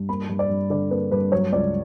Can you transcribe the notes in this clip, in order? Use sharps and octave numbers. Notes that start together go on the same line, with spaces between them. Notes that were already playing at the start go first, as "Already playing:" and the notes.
Already playing: G2
A#3 B5
G2
D5
G2
D3 D5
A#3 B4
G2 B4
F#3 C#5
C#2 D5